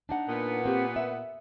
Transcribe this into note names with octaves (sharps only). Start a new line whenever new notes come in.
D4 D#4 F#5
A#2 B3
A#3 C4 G4
E5